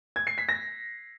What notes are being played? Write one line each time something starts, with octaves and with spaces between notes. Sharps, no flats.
G#6
C7
B6
A#6